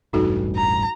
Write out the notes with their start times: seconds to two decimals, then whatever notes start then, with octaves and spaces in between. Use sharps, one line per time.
0.13 E1 A1 G2 D#4 F#4 A4
0.55 A#5